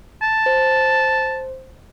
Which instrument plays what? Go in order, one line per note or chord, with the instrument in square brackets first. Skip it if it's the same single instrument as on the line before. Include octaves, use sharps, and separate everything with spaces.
[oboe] A5
[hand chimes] C5